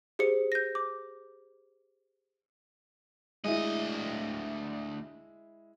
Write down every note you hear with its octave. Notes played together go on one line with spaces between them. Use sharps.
G4 G#4 C5 C#7
G6 A#6
D6
D2 G#3 E4 D#5